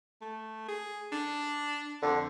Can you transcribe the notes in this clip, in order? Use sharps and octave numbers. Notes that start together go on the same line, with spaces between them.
A3
G#4
D4
F2 D3